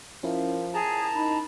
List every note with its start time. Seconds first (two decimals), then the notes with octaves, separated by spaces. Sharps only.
0.23 F3 C#4 E4 A#4
0.74 G#4 A5 A#5
1.15 D#4 B5